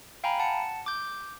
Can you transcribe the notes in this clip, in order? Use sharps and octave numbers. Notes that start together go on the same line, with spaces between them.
F5 G5 G#5 A#5 B5
F#5 A5 C#7
D6 G6